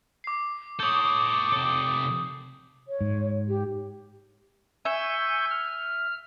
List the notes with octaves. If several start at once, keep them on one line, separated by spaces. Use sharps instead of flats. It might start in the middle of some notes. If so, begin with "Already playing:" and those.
D6 C7
A4 C#5 D6 D#6 G6
C3 A4
C#5
G#2
G4
E5 G#5 C#6 G6
F6